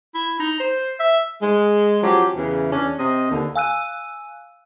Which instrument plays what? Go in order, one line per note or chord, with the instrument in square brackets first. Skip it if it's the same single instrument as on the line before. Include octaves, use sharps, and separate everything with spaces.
[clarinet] E4
D#4
C5
E5
[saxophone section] G#3
F3 F#3 C#4 G4
E2 C#3 E3
E2 C#4 D4
C3 D#5
D#2 D3
[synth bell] F5 G#5 E6 F#6 D#7